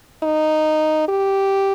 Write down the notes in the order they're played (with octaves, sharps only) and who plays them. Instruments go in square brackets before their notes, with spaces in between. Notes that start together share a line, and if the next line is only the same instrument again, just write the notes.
[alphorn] D#4
G4